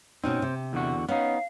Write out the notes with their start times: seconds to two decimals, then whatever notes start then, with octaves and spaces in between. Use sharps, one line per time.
0.24 B2 C4 C#4 D#4
0.42 C3
0.73 E2 D3 F#4
1.09 B3 C#4 D#4 F5